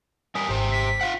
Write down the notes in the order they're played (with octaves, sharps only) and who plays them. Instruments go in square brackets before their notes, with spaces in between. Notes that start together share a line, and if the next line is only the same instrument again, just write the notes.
[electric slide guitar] G3 A#4 G#5 [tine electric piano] D#6 B6
[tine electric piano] G#1 G#2 [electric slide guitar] G4 C5
[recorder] B6
[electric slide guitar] F4 F5 F#5